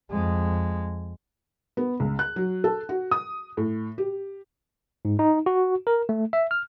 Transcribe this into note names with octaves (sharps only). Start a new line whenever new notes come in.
F2 G#3
B3
C#2
F#6
F#3
A4
F#4
D#6
A2
G4
G#2
D#4
F#4
A#4
A3
E5
F6